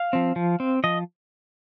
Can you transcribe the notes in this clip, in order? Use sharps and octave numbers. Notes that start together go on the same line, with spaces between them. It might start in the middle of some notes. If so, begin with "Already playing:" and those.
Already playing: F5
F3 C4
F3
C4
F3 D#5